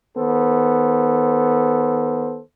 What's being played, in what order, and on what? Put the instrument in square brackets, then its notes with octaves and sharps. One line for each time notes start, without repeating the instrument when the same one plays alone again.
[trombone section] D#3 B3 A4 C5